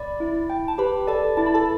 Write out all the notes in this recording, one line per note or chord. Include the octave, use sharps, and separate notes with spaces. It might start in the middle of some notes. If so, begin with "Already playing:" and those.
Already playing: D5 B5
E4
G5
A5
G4 B4 B5
A4 D5 A5
E4 A5
B5
A4 A5